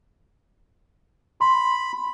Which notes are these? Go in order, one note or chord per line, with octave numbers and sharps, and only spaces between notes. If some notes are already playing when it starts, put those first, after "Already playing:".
B5 C6